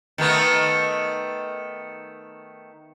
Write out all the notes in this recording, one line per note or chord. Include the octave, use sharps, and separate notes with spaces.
D#3 A3 B3